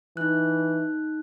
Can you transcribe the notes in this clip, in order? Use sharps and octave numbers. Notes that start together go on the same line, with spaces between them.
E3 D#4 F#6